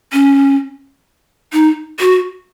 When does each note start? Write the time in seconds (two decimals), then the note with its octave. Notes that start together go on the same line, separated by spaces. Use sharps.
0.13 C#4
1.53 D#4
2.00 F#4